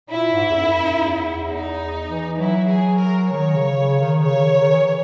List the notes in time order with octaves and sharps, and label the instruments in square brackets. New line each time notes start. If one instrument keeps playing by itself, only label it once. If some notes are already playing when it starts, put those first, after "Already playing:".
[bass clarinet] A#2 [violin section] E4
[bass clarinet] G#2
E2
F#2
E2
[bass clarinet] E2 [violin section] D#4
[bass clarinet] E3
[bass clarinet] F#3 [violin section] E4
[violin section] G#4
A#4
[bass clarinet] D#3 [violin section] C#5
[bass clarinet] C#3
C#3
D#3
[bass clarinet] C#3 [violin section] C#5
[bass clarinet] D#3
C#3
D#3
E3